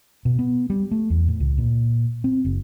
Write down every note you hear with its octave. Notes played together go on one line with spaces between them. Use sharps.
B2
B3
G3
A3
E2
A2
C#2
A#2
C4
F#1